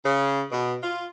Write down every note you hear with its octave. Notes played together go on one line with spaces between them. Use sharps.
C#3
B2
F4